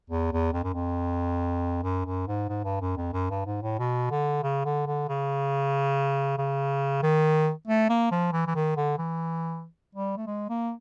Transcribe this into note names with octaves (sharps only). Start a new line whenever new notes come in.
E2
E2
F2
F#2
F2
F#2
F#2
G#2
G#2
G2
F#2
F2
F#2
G2
G#2
A2
B2
D3
C#3
D3
D3
C#3
C#3
D#3
A3
A#3
F3
E3
E3
D#3
D3
E3
G3
A3
G#3
A#3